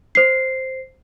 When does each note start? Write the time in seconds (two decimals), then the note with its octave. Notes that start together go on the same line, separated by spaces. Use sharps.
0.15 C5 C7